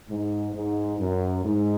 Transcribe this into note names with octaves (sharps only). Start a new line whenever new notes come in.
G#2
G#2
F#2
G#2